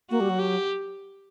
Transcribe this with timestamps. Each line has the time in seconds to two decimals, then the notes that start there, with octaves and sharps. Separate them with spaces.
0.10 A#3 F#4
0.20 G3
0.30 F#3
0.39 G4